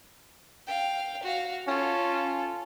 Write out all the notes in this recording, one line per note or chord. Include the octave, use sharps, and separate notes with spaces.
F5 G5
F#4 F5
C#4 F4 A4